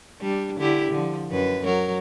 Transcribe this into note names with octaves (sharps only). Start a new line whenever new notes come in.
G3 D4
D3 E4 G4
D3 F3
F#2 B4
F#3 A#4